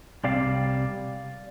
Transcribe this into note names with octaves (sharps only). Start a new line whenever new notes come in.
C2 C3 G3 C4 D5 F5